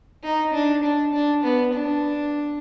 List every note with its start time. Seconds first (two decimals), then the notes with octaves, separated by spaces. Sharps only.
0.24 D#4
0.54 D4
0.83 D4
1.13 D4
1.44 B3
1.73 D4